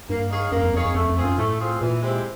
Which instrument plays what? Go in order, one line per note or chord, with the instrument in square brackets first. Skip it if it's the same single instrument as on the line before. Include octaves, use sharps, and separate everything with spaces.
[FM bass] G2 [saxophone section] A#3
[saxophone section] D#4 G#4 C#5 F5
[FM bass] F#2 [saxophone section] A#3
[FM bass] F2
[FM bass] F2 [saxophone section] D#4 G#4 C#5 F5
[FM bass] F2
[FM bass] F2 [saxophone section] A3
[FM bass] F2
[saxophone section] C4 F4 G#4
[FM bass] F#2
[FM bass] A2 [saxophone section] A3
[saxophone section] C4 F4 G#4
[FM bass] A#2 [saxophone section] E3
[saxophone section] G#3 C4 E4 G4